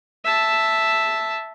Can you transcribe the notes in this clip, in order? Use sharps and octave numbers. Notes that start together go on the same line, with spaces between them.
E5 A5